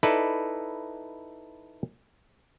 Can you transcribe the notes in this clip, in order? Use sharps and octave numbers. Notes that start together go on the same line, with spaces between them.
D#4 E4 A4 B4 D5